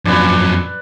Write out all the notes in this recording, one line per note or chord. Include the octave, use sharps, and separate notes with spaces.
F2 A#2 F#3 C#4 D4 B4 D5